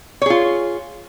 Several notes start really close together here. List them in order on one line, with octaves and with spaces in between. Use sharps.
C#5 G#4 F4